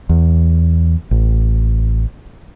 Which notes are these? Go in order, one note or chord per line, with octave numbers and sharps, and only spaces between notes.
E2
A1